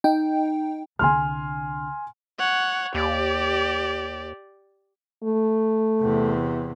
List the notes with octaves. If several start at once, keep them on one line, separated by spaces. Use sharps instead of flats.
D#4 G5
C2 D3 G#5 C6 F6
C#5 F#5
D#2 G4 D5
A3
E2 C3